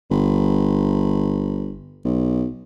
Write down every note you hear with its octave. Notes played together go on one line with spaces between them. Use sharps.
G1
B1